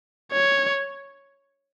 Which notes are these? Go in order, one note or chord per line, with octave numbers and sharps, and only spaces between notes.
C#5